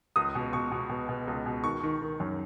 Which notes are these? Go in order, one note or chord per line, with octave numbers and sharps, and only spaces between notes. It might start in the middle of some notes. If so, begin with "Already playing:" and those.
C#2 D#6
B2
B2 C#6
B2
B2
B2
C#2
B2
D#3 C#6
D#3
D#3
F#2